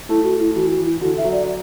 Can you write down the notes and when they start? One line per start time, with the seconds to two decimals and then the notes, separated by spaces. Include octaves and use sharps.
0.09 A3 E4
0.24 F#4
0.31 A3
0.39 E4
0.55 E3 F#4
0.70 F#4
0.78 E3
0.85 E4
1.01 D3 F#4
1.17 E5
1.25 F#3
1.32 D5